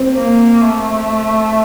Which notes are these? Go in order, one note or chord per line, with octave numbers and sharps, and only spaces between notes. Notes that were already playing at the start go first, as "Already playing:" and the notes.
Already playing: C4
A#3
A3